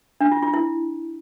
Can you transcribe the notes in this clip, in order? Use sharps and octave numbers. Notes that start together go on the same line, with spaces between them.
D4
F4
F4
E4